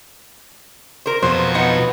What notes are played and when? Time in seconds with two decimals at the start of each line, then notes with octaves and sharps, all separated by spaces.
1.06 A#4 C5
1.22 F2 B2 F#3 C5
1.55 B3 D#4